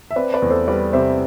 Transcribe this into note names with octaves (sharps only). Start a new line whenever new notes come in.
E5
C4 B4 D5
B4 D5
E2
A4 C5
G3 B4 D5
C3 C5 E5